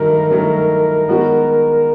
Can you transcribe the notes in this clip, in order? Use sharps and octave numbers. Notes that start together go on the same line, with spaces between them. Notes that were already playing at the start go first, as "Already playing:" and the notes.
Already playing: G2 D#3 F#3 A3 A#4
G2 D#3 F#3 A3
D#3 G#3 B3 D#4 F#4